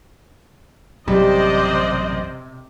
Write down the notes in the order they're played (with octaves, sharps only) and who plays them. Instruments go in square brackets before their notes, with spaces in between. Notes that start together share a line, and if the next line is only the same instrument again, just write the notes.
[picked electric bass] A1 F#2 [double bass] C3 [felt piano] G3 [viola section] C5 D5 D#5